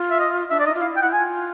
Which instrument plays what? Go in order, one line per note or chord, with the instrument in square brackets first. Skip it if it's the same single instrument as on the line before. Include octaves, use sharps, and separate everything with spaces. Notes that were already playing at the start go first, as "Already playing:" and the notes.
Already playing: [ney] F4
[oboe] E5
D#5
[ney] D4 [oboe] E5
[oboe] D5
[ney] D#4 [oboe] D#5
[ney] F4
[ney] E4 [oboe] F5
[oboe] G5
[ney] E4 [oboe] F#5
[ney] F4 [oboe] G#5